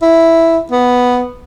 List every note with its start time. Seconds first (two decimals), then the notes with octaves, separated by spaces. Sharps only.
0.02 E4
0.72 B3